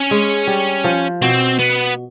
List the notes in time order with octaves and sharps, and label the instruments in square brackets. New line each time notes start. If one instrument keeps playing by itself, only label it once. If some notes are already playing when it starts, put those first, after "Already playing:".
Already playing: [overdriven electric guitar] C#4
[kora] G#3
G3
F3
[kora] B2 [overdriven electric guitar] C4
[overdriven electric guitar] B3